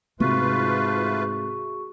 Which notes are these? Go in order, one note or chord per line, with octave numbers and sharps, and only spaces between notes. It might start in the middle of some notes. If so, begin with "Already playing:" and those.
G#2 C3 A3 F4 F#4 G#4 B4 C#6